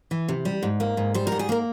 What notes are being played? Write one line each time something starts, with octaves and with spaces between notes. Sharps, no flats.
E3
C3
G3
G#2
A#3
G#2
G3 C5
A#4
G#2
G#4
A#3 A#4